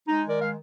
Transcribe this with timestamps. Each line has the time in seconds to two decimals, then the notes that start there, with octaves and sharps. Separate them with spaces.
0.07 G#3 D#4
0.24 D#3 A#4 D5
0.40 G#3 F5